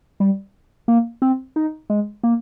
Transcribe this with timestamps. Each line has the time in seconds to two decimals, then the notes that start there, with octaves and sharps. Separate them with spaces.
0.20 G3
0.88 A#3
1.22 C4
1.56 D#4
1.90 G#3
2.24 A#3